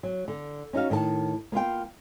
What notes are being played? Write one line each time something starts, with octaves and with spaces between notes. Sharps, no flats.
F#3
D3
C#4 D#4 F#4 F5
A2 D#3 E5 A5
A#3 B3 F4 G5